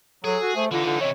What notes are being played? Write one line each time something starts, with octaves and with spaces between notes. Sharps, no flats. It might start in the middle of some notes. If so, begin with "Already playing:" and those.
F#3 G#4 A4
F#4
A3 C5
D3 E3 D#4 F4
D3
C3 E3 C#5 D#5